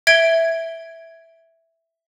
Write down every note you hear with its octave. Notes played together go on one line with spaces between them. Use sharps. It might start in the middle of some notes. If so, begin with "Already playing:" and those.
E5 G#6 D7 G7